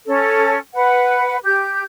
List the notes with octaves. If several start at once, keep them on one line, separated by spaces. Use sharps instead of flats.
C#4 A4
B4 F#5
G4 G6